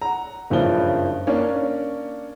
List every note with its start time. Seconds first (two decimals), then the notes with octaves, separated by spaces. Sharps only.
0.02 F#5 A#5
0.50 F#1 G2 F3 C#4 E4 G7
1.27 A#3 C#4 D4 C#5